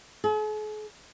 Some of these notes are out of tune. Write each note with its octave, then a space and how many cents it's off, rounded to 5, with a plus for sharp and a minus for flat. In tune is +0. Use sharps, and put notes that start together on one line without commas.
G#4 +45